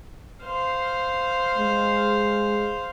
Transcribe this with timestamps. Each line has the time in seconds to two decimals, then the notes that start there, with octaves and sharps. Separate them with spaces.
0.44 C5 F5
1.57 G#3